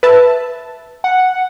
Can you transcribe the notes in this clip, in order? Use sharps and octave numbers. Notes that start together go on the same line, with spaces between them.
B4 E5 A5
F#5